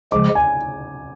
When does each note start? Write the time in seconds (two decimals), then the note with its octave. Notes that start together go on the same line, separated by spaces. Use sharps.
0.12 C#3 F3 G#3 D6
0.35 G#5